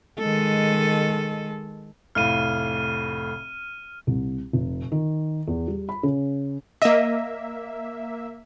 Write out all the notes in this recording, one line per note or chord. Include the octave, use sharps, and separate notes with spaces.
D#3 G#3 A4
F1 A2 F5 F6 D#7
C2
F1
D#3
E2
G3
B5
C#3
A#3 D#5 E5